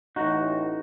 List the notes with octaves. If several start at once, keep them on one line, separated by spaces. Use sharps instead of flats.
A1 D#4 F#4